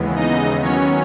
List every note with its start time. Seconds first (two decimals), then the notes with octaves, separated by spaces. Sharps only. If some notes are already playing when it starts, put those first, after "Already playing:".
Already playing: D#2 C#3 E3 G#3 B3
0.15 D#4 D#5
0.62 D#2 D#3 F#3 B3 C#4 C#5